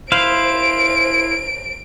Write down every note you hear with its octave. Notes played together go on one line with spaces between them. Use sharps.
E4 C5 F5 D7